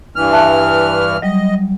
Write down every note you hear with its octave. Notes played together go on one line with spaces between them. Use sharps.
G2 E3 F6
E5 A5 F#6
F#3 G3 D#5